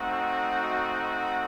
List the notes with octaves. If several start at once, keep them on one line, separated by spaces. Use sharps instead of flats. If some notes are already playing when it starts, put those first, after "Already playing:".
Already playing: A3 C4 D#4 F#4
D#5